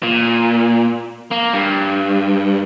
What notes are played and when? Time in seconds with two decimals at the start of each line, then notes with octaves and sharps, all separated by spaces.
0.03 A#2
1.31 A#3
1.53 G2